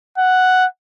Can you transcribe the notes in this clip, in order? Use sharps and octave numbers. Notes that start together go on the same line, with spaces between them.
F#5